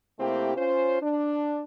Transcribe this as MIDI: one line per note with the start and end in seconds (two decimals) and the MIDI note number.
0.19 0.52 48
0.19 0.52 57
0.19 0.52 58
0.19 0.52 60
0.19 0.52 64
0.19 0.52 67
0.56 1.01 61
0.56 1.01 65
0.56 1.01 72
1.01 1.64 62